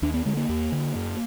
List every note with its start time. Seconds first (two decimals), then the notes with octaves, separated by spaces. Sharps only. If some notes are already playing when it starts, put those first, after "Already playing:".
0.02 D#2 D4
0.14 B3
0.25 D3 G#3
0.37 A#3
0.49 D#2
0.72 D3
0.95 F#2